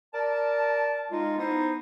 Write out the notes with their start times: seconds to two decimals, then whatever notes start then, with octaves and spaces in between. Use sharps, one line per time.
0.14 A#4 D5 A5
1.11 G#3 D#4 F4
1.38 B3 D#4 E4 C5